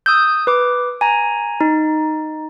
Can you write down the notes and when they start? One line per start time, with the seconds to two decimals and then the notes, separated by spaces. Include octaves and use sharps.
0.06 D#6 E6 G6
0.47 B4 D6
1.01 G#5 A#5
1.61 D#4